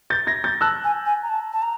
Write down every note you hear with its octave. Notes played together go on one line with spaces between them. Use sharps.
G6 A6
G#6 A#6
G6 A6
A5 E6 F#6
G#5
G#5
A#5
A5
A5
A#5